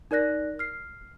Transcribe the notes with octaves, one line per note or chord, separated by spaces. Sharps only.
D#4 A#4 D5 F#6 A#6
F6 C7